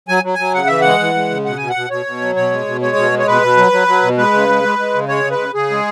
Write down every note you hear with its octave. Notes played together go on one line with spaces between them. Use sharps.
F#3 G#5
F#3
F#3 G#5
C#3 F#5
E3 E5
G#3 F#5
E3
G#3
C#3
B2 F#5
B2 G#5
F#5
B2
B2 C#5
B2
F#3
B2 C#5
G#3
B2
G#3 C#5
B2
G#3
C#5
B2 B4
B2
F#3
F#3
F#3
B2
G#3 B4
C#3
G#3
G#3
G#3
C#3
G#3 C#5
C#3
B4
C#3
C#3 G#4
G#3